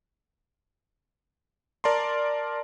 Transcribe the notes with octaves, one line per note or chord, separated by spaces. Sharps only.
A#4 D5 A5 A#5 C6